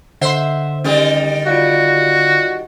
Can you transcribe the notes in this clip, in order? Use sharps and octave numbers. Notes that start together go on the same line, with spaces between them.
D3 C5 E5 F#5 C6
D#3 G3 C#4 G#4
F4 F#4 D5 F5